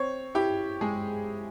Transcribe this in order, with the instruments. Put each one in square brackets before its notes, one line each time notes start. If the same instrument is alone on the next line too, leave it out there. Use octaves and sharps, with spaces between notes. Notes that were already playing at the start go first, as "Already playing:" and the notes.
Already playing: [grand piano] C4 C#5
E4 G4
G#3 G#4